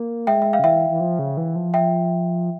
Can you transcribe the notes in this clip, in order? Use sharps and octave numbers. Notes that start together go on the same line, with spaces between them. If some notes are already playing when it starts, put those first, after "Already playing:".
Already playing: A#3
G#3 E5 G5
E5
F5
C#3
E3 E5 G5
E3
F3
C#3
E3
F3
E5 G5